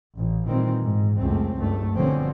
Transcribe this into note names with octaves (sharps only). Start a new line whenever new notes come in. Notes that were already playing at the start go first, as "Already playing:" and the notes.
A1
A#2 D#3 E3 G3 C4
G#2
C#2 F#2 A3 C4
F#1 C#2 G2 A3
G1 B2 D3 F3 C4 C#4